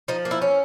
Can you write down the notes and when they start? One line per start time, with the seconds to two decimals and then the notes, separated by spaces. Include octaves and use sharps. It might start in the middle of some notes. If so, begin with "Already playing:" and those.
0.08 F3 D#4
0.25 A#3
0.31 E4
0.42 C#4